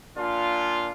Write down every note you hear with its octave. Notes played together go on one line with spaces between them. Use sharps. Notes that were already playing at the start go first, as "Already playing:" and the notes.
A#2 D4 F4